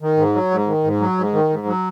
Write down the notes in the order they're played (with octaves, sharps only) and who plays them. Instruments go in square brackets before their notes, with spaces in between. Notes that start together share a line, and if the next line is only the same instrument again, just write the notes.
[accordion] D#3
G#2
F#3
G#2
D#3
G#2
F#3
G#2
D#3
G#2
F#3